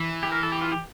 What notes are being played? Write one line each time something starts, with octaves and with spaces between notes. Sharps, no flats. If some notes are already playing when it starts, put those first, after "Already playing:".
Already playing: E3
G4
A#4
A4
G4
F4
G4